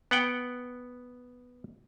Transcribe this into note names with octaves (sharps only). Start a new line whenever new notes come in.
B3 F#5 G5